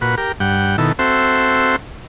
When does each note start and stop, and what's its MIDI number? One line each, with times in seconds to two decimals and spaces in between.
0.01 0.15 46
0.01 0.15 66
0.01 0.15 71
0.18 0.32 67
0.18 0.32 70
0.40 0.76 43
0.40 0.76 78
0.40 0.76 79
0.78 0.92 47
0.78 0.92 51
0.78 0.92 64
0.78 0.92 69
0.99 1.76 60
0.99 1.76 66
0.99 1.76 69
0.99 1.76 72
0.99 1.76 76